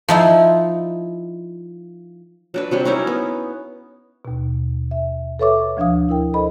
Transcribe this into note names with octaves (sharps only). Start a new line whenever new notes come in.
F3 D#4 E4
F#3 D4 B4
C3 F#3 G3
C#4 D#4 E4 A#4
B3
D#2 B2
E5
A4 B4 C#5 E5 C#6 D6
D2 F3 D4 F5 D#6
E4 A#4 G5
A4 C5 D#5 B5